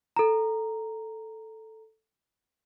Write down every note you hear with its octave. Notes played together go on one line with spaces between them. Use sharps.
A4 A#5